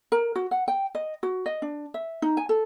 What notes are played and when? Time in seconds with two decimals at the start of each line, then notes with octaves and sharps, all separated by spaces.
0.12 A#4
0.35 F#4
0.51 F#5
0.68 G5
0.95 D#5
1.23 F#4
1.46 D#5
1.62 D4
1.94 E5
2.22 D#4
2.37 G#5
2.49 A4